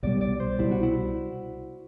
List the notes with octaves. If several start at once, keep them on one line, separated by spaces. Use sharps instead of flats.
C2 B2 G3 D5
D5
C5
C2 B2 G3 E4
F#4
E4